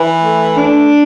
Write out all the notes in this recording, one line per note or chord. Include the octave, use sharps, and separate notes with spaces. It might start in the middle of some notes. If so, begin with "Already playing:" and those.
Already playing: E3
A3
D4